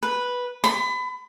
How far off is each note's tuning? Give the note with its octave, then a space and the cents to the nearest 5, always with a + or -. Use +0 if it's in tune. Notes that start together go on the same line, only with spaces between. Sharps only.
B4 -5
B5 +30